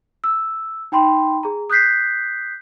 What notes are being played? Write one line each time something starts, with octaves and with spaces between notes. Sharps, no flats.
E6
D#4 G5 B5 C6
G#4 A#5
D#6 F#6 G6 B6 C7